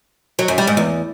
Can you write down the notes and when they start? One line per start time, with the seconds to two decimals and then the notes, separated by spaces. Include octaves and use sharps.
0.39 F#3
0.48 F#2
0.58 G3
0.67 G#2
0.77 E2